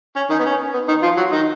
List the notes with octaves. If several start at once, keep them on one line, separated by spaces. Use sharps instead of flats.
C#4
D#3 D#4
B3
C#4
B3
D#3 D#4
F3 F4
F#3 F#4
D#3 D#4